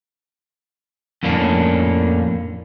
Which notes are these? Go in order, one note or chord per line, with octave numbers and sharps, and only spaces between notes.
F2 A2 A#3 C#4 D4